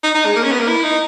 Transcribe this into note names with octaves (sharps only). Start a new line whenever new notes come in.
D#4
D#4
G#3
A#3
C#4
B3
A#3
E4
D#4